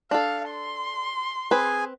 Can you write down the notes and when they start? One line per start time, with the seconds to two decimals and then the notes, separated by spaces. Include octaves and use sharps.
0.11 D4 A4 F5
0.50 C6
1.51 C4 G#4 B4 G#5